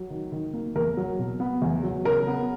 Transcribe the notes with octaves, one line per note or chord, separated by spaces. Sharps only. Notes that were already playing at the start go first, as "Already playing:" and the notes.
Already playing: F#3
D#3
D#3
A#3
E2 A#4
F#3
B2
B3
E2
F#3
C#3 A#4
B3